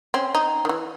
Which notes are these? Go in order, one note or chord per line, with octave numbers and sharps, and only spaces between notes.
C4 C#4
D#4
D#3 E3